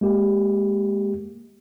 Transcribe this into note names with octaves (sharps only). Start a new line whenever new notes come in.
G#3 A#3 G4